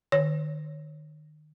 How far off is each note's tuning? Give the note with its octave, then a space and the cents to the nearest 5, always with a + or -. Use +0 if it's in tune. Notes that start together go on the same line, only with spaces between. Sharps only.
D#3 -35 C#5 +0